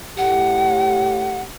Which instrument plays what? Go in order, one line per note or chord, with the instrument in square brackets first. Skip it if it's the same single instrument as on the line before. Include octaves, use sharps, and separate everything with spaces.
[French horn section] A2 G4 [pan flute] F#5